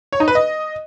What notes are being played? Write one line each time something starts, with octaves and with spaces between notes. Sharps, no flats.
C#5
D#4
B4
D#5